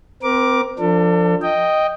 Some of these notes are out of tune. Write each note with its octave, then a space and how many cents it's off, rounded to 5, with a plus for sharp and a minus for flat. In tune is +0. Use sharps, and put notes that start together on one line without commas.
C4 -25 A#4 +20 D6 +0
F3 +0 D4 +0 A4 +35
D#5 +0 G5 +0